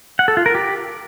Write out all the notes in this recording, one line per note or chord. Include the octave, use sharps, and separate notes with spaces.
F#5
A4
F4
A#4
G4